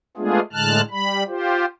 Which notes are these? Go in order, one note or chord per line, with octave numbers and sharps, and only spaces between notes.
G#3 A3 B3 D4 F4 G#4
A2 D3 G#3 A5 F6 F#6
G3 B5
F4 G4 C5